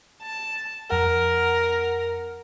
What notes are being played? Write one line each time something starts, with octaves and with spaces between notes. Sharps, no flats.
A5
F2 A#4 F#5